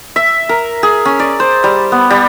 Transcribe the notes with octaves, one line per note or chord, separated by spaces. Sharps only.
E5
A#4
G#4
C#4
D5
C5
G3
B3
G3